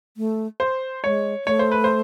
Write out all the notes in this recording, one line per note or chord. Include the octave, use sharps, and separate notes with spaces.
A3
C5
G#3 C#5
A3 C#5
C5
B4
C5